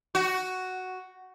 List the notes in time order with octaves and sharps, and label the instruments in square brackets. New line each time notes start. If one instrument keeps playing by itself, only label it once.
[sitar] F#4